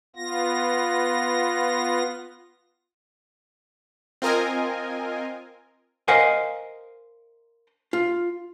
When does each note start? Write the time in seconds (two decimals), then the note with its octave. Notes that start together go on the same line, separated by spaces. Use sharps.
0.16 B3 F4 A#6
4.22 C4 F4 A#4 D#5 G#5
6.08 A#4 C5 D#5 F5 F#5 G#5
7.93 F4